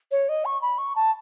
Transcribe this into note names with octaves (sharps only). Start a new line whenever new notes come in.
C#5
D#5
C#6
B5
C#6
A5